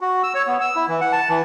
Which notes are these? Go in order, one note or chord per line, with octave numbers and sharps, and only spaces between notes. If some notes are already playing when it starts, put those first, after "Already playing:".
F#4
E6
C#5
B3
E6
E4
E3
F#5
A5
E3